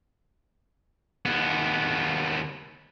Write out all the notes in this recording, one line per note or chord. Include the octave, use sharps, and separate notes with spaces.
D#2 B3